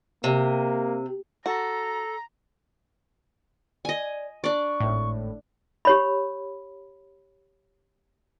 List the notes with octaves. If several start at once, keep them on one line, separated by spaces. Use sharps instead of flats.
C3 A#3
F#4 A4 A#5
D5 D#5 G#5
D4 D5 C#6
G#1 A2
G4 C#5 B5